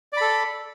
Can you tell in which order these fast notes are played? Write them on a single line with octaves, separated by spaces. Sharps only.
D5 B5 A4